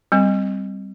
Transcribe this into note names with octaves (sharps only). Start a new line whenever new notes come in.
G3 C4